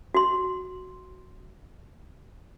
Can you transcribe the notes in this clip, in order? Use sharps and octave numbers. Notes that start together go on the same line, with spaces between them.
F#4 C6